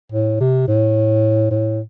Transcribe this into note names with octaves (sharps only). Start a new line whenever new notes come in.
A2
C3
A2
A2